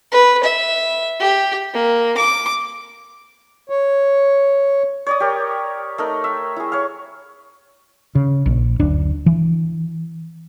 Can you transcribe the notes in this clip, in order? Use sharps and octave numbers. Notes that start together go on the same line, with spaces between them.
B4
E5
G4
A#3
D6
C#5
C#5 D5 D#6
G4 A#4
A3 D#4 A#4
E5
E4 G#4
C#5 F5
C#3
A#1
F#1 D2 D4
E3